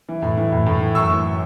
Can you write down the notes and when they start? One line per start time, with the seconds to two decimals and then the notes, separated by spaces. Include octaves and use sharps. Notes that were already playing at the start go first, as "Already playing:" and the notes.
0.09 E3
0.22 A2
0.37 E3
0.52 A2
0.66 A2
0.81 E3
0.95 F#2 C#6 E6
1.10 E3